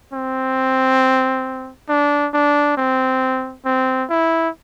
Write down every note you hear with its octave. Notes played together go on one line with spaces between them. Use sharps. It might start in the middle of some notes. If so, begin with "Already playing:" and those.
C4
D4
D4
C4
C4
E4